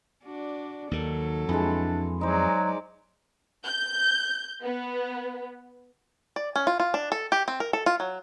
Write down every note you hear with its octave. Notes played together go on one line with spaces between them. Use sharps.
D4 F#4 D5
D#2 D#3 F#3 A4
F2 E3 G#3 D4
F#3 G#3 D#4 C5 D5
G6
B3
D5
C#4
F4
F4
D4
A4
G4
C4
A#4
A4
F4
F#3